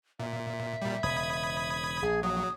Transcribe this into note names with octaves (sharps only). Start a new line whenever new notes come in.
A#2 E5
A#2 G3
E1 C#3 B5 D#6 G#6
A#1 G#4
F#3 D#6